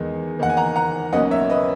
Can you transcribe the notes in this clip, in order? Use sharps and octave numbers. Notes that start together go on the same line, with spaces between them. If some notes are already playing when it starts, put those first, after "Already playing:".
Already playing: E2 D#3 G#3 B3
E2 D#3 A#3 F#5
G#5
F#5 A#5
F#5 A#5
B1 B2 A#3 C#4 D#5 F#5
C#5 E5
B4 D#5